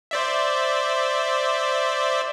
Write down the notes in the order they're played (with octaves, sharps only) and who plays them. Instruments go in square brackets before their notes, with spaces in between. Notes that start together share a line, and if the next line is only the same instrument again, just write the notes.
[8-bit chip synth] C5 D5 E5